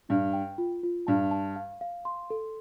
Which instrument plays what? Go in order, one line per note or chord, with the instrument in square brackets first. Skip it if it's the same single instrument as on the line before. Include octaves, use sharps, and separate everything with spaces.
[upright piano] G2 [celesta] D4
[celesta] G5
F4
F4
[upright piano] G2 [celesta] A5
[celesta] A5
F5
F5
C6
A4